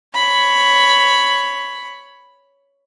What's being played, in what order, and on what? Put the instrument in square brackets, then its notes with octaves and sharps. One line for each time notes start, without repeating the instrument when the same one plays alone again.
[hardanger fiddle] C#5 B5